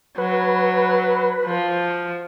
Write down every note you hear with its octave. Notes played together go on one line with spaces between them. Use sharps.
F#3 B4
F3